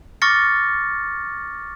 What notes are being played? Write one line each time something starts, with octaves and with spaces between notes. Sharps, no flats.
C#6 D6 F6 A6 A#6 C#7